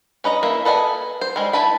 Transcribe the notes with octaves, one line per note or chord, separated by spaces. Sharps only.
C#4 B4 D#5 A#5
A#3 E4
A4 B4 D#5 E5 G#5
C5
G3 G#3
E4 B4 A5 B5